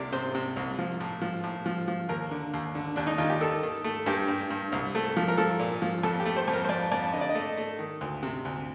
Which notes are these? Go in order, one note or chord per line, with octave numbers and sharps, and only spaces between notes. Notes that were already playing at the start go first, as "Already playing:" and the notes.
Already playing: C2 C3 D5
C3 C5
C3
C2
F3
A2
F3
A2
F3
F3
D#2 A#4
D3
D#2
D3
D#2 D4
D#4
D#2 F4
G4
D#3 A4
D#3
A3
G2 G4
G2
G2
C2
A3
F3
A#4
F3 A4
A#2
F3
F2 A4
G4
A3
C5
F2
A#4
C5
F2 D5
F2 D5
D3 D#5
D5
D#5
A3
A3
D#3
D2
C3
D2